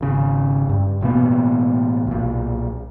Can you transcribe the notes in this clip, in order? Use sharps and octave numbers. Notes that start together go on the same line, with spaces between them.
G#1 C#3
G2
A1 B2 A#3 B3
B1 A#2